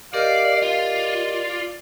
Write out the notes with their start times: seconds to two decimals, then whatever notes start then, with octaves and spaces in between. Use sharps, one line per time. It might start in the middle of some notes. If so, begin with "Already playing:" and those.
0.14 G4 A#4 D5 D#5 F5
0.63 F4 D5